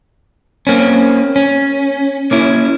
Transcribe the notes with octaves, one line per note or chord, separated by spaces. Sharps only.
A#3 C4 C#4
C#4
A#3 C#4 E4